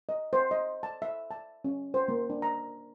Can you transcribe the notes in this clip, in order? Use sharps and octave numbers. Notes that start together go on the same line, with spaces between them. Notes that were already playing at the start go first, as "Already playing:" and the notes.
D#5
C5
D#5
A5
E5
A5
C#4
C5
A#3
D4
A#5